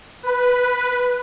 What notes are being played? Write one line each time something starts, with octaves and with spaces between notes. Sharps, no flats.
B4